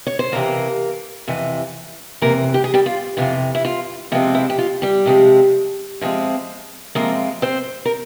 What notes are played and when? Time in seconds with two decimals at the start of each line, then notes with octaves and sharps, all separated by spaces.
0.07 C#5
0.19 C5
0.32 F2 C3 E3 A#3 A#4
1.28 F2 C3 E3
2.22 F2 C3 E3 A#3 A#4
2.54 G4
2.64 G#4
2.74 G3 G4
2.86 F4
3.17 F2 C3 E3 F4
3.55 E4
3.65 F4
4.12 C3 F3 G#3 C4 F4
4.35 E4
4.50 G4
4.58 F4
4.82 G3 G4
5.06 C3 F3 G#3 C4
6.01 C3 F3 G#3 C4
6.95 C3 F3 G#3 A#3 C4 A#4
7.42 C4 C5
7.85 A#4